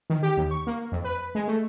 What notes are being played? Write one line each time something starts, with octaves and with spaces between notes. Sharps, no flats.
D#3
G4
D#2
C#6
A#3
F2
B4
G#3
A3